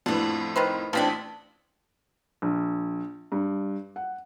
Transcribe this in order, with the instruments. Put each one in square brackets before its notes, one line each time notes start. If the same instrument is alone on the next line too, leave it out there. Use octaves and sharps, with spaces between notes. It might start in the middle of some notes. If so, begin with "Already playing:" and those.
[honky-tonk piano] F2 A2 [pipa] B3 D4
[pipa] D#3 B4 C5
[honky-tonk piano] A1 B6 [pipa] F3 C4 D4
[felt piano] A#1
G2
F#5